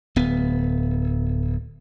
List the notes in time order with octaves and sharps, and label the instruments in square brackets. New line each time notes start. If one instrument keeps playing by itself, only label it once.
[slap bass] D1 B3